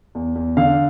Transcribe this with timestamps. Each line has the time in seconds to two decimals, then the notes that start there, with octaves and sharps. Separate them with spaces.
0.15 E2
0.35 E2
0.57 D3 F5